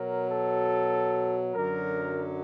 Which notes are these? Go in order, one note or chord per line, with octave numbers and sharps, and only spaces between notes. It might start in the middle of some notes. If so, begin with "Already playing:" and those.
Already playing: B2 F#3 A#4
A4
F#2 D3 F#3 A#4